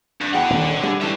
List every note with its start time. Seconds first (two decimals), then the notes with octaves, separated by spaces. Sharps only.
0.21 G2 D4 F#6 G6 B6
0.34 E2 D3 B3 F#4 G#4 F#5 G5
0.50 D#1 A#1 D#3
0.83 B2 G3 D4 G#4 A4
1.01 G#2 E3 C#4 D4 G4 E5 A5